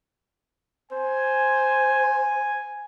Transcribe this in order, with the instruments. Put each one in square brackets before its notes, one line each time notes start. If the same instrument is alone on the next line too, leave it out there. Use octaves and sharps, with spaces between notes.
[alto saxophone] C5 [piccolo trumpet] G#5